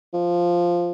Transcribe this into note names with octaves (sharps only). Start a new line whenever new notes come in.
F3